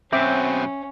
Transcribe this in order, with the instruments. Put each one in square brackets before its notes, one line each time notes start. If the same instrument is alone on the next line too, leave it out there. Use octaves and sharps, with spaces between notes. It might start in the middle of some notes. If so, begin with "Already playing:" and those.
[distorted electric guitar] F#2 B2 [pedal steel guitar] C4 [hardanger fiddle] C#4 [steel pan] E5 D6